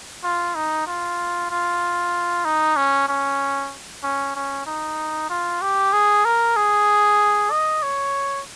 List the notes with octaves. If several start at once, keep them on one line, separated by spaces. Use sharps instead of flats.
F4
D#4
F4
F4
D#4
C#4
C#4
C#4
C#4
D#4
F4
G4
G#4
A#4
G#4
D#5
C#5